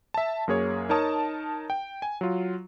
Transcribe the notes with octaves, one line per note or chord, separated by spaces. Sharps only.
E5 A5
F#2 A#3 G#4 C#5
D#4 A#4 C#5 A5 D#6
G5
G#5
F#3 F4